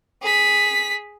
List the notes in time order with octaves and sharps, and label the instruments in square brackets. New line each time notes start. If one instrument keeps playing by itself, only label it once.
[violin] G#4 B6